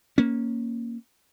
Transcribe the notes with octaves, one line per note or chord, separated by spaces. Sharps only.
A#3 C#4